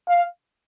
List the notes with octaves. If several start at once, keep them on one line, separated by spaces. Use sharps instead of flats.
F5